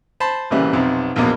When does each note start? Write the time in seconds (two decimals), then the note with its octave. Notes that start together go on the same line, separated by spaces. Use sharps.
0.20 C5 A5 B5
0.50 C2 A#2 C#3 E3 G3
0.73 B1 F2 C3
1.16 A#1 E2 B2 A#3